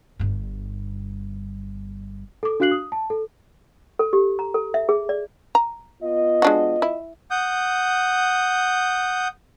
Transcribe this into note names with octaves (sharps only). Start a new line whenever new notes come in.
G1 G2
A4 D6
D4 F#4 F5 F#6 C7 F#7
D#6
A5
A4
A4
G4
A#5
A4
E5
G#4
D5
A#5
B3 F4 D#5
G#3 D4 F#4
E4
F#5 D#6 G6